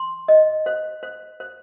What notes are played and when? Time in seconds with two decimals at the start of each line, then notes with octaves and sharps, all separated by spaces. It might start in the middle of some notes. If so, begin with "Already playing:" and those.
Already playing: C6
0.28 D#5
0.66 C5
1.03 C5
1.40 C5